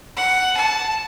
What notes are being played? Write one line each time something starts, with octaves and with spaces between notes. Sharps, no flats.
F#5
A5